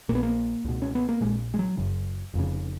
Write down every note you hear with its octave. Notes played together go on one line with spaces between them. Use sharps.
A#1 A#2 A#3 B3
A#3
C#2 B2
C#4
B3
A#3
A#1 A#2 G#3
G#3
F#3
F#1 F#2 C#3
F1 F2 C#3